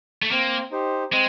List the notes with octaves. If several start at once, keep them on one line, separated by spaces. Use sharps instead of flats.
A3
A#3 C4
D#4 G4 C5
G#3 C4